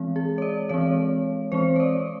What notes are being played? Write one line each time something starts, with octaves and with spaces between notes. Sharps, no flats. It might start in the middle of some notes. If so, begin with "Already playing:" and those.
Already playing: E3 G#3 C4
G#4
C#5
D5
E3 G#3 C4 C#5
E3 G#3 C4 C5
C#5
D5